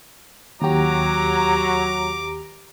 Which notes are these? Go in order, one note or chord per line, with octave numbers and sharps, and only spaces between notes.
D#2 F#3 G4 A#5 D6